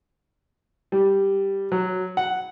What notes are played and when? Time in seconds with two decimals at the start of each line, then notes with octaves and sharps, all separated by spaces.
0.92 G3
1.72 F#3
2.17 F#5